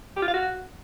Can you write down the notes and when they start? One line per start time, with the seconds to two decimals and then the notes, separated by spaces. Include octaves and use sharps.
0.16 G4
0.22 F4
0.28 F5
0.34 F#4